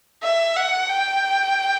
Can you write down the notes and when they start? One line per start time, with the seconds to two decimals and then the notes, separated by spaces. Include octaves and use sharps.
0.23 E5
0.57 F#5
0.89 G5